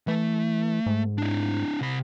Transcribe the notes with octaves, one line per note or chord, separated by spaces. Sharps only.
E3 A3
G#2
D4 E4
C3 B5